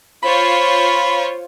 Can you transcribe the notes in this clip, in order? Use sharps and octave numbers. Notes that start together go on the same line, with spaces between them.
F4 C5 C#5 B5